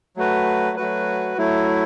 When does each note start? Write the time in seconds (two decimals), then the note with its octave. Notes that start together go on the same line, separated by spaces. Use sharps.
0.16 F#3 A3 F#4 B4
0.77 F#3 A3 F#4 B4
1.38 F#3 A3 E4